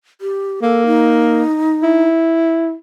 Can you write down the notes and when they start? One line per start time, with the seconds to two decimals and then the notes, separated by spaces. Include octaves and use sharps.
0.21 G4
0.62 A#3 A4
0.86 D#4
1.83 E4